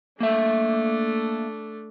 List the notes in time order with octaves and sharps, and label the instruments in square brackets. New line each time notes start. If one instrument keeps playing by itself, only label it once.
[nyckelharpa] A3 D4 [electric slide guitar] A#3 E5